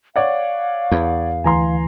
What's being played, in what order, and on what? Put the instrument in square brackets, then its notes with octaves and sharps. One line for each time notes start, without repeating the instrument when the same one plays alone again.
[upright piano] C#5 D5 F#5 [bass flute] F5
[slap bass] E2
[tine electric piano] D2 E3 [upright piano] G#5 A#5 C6